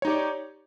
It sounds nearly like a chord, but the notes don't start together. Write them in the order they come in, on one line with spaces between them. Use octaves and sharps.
C#5 D#4 G4 D5